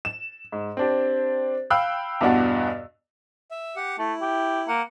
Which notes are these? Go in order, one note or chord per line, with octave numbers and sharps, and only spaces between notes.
E7
G#2
C4 D4 G4
F5 G5 B5 E6 F#6
E2 G2 B2 D4 F#4
E5
G4 F#5
A3 E4
G4
A#3 F#5